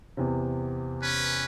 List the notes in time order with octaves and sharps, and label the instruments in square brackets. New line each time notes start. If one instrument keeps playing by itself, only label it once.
[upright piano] E2 C3
[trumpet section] C#4 B4